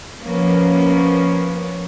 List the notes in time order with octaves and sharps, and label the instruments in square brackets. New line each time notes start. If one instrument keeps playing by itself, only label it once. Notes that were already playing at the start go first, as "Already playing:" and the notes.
[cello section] F3 A#3 B3 C#4